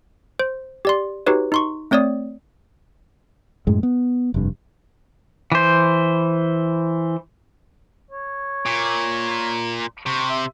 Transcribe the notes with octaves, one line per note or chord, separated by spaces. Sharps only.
C5
G4 D5 C6
D#4 F#4 G4 B4 C#5
D#4 C6 C#6
A3 C4 C#5 D5 D#6
F#2 A2 G#3
B3
F1 G2
E3 C5
C#5
A#2
C3 C#6
E5